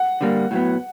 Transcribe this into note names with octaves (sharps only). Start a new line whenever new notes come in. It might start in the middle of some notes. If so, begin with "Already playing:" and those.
Already playing: F#5
D3 G3 A#3 D4
A2 F#3 B3